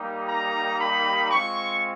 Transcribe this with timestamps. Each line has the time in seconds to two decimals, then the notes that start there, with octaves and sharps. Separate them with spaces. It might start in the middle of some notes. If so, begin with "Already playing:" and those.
Already playing: G3 A#3 D#4 G4
0.28 A#5
0.79 B5
1.31 G#3 C4 F4 C#6